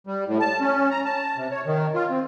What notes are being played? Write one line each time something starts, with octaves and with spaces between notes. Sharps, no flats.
G3
A2
A5
C#4
A#5
A5
C3
C#5
D#3
F4
C4